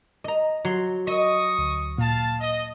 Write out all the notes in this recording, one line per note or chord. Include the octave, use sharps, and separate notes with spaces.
D#5 A#5
F#3 C6
D#5 C#6 D#6 A#6 D#7
D2
A#2 F5 A5
D#5